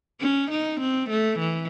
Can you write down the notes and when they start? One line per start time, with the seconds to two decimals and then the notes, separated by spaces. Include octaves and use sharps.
0.21 C#4
0.51 D#4
0.80 C4
1.10 A3
1.39 E3